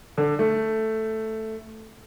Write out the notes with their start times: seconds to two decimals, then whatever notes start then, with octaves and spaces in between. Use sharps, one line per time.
0.18 D3
0.39 A3